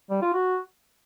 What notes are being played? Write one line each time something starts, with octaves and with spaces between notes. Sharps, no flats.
G3
F4
F#4